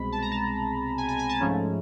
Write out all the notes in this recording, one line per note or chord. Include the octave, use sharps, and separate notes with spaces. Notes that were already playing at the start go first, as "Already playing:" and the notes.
Already playing: C2 B2 G#3 C4 B5
A5
A#5
A5
G#5
G#5
G#5
A5
G#2 F3 A3 C#4